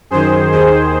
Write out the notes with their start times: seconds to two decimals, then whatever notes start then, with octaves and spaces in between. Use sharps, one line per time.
0.11 F#2 D#3 G#4 C5
0.52 D#2 D#3 G#4 C5